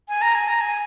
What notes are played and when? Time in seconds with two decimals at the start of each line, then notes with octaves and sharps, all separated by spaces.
0.09 G#5
0.22 A#5
0.35 G#5
0.48 A#5
0.61 G#5